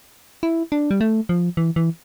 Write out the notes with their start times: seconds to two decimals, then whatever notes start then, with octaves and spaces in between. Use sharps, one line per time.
0.43 E4
0.72 D4
0.91 G3
1.01 A3
1.29 F3
1.57 E3
1.76 E3